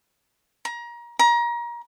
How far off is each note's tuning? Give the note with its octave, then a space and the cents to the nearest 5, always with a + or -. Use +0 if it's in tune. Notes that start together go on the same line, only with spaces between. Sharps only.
A#5 +30
A#5 +30